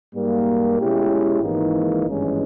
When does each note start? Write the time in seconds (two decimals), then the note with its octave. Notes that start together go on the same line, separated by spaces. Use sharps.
0.15 G#2 G3 A#3
0.79 B2 G#3 C#4 E4 G4
1.43 G#1 G#2 E3 A#3 D#4
2.07 G#1 G2 E3 G#3 C#4